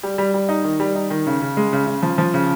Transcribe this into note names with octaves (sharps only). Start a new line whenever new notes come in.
G3
G3
G3
D#4
D#3
G3
D#4
D#3
C#3
C#3
G#3
C#3
C#3
F3
F3
C#3